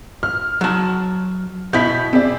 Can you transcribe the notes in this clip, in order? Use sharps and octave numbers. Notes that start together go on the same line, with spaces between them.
F6
F#3 A5
B2 E4 G6 B6
C4 G#4 D5